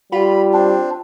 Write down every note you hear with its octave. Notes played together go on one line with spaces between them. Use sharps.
G3 F4 B5
C4 D4